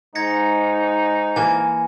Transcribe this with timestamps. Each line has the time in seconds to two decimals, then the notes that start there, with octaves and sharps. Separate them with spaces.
0.15 G#2 D#4 G#6 A#6 C#7
1.36 E3 A#3 G#5